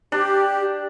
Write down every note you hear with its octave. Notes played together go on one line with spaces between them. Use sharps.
D4 G4